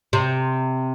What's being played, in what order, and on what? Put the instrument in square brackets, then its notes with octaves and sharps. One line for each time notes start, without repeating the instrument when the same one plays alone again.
[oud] C3